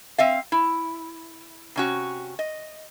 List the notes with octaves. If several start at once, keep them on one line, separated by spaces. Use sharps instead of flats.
C4 E5 F5
E4
C3 C#4 F#4
D#5